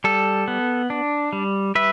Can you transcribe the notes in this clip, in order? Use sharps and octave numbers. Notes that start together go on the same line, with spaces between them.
G3 A4
B3
D4
G3
G3 B4 E5